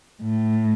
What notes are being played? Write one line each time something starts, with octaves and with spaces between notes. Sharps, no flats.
A2